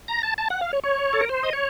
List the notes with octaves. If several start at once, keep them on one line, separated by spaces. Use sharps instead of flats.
A#5
A5
A5
F#5
F5
C#5
C#5
A4
A#4
C5
D#5
C#5